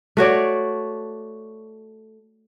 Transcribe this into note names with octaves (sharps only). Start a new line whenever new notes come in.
A3 F#4 C#5 D5